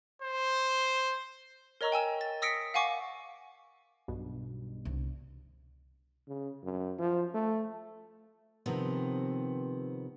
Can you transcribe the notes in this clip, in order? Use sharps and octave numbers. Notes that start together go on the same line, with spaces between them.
C5
A#4 C#5 D#5 A#5 C#6 E6
G5 G#5 E6 E7
A6
D#6 E6 A#6 B6 C#7 D7
F5 F#5 G#5 C#6 D6
B1 G2 B2
C2 D3
C#3
F#2
F3
A3
C3 D#3 F3 B3 C4